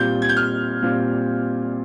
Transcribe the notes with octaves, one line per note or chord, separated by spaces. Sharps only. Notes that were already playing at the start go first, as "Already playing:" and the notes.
Already playing: A#2 G3 C4 F4 G6
G#6
G6
F6
A#2 G3 C4 F4